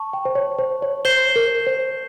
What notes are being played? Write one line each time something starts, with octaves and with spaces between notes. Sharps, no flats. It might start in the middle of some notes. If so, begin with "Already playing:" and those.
Already playing: A5 C#6
G5
C5
C#5
C5
C#5
C5 G6 C7 E7 G7
A#4
C5